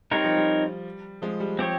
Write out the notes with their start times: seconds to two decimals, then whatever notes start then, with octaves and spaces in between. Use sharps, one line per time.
0.11 G3 C4 D#4 A#4 C#5
0.24 F3
0.37 G3
1.22 F3 G#3
1.40 G3
1.59 F3 C4 G4 C#5